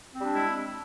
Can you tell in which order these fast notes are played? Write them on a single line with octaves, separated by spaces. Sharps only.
C4 G3 D4 G#3 E4